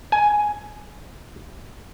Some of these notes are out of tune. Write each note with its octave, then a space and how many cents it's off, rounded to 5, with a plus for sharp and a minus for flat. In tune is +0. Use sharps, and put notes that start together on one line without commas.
G#5 +10